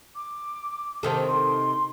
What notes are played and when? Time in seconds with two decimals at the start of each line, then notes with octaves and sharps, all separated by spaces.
0.15 D6
1.03 C3 D#3 A4
1.26 C6